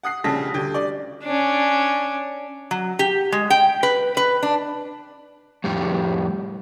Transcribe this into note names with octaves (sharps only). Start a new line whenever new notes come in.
F#5 D#6 F#6 C7
A#1 C#3 G3 A5 A#6 B6
D2 G4
D5
C#4 D4
F#3
G4
G#3
G5
B4
B4
D4
F2 A2 G3